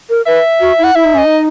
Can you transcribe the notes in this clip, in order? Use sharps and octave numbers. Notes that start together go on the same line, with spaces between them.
A#4
B4 E5
F#4
E4
F#5
E4 E5
D#4
C#4 D#5
D#4